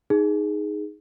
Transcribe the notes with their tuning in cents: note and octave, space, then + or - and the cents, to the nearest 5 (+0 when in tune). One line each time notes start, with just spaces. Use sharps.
D#4 +0 G#4 +0